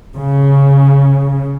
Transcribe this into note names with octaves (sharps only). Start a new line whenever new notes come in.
C#3